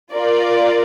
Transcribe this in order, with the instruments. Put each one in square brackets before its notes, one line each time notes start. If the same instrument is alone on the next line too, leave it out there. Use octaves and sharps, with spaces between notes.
[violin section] F4 A#4 D5